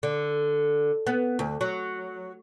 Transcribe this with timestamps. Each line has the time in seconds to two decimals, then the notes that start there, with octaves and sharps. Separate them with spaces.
0.03 D3
1.07 B3
1.39 D2
1.61 F#3